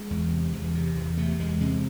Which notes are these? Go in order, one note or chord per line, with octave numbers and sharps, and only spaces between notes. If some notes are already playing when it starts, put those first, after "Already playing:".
Already playing: G#3
E2
C3
E2
C3
E2
C3 A3
E2 G#3
C3 G#3